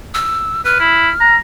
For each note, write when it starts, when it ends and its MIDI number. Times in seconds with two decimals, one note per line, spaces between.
0.15 0.64 88
0.65 0.75 71
0.65 1.36 89
0.80 1.09 64
1.20 1.36 82